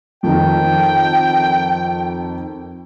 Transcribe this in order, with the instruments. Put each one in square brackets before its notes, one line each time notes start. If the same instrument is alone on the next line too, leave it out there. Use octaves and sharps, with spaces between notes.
[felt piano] F2 D#3 [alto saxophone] G5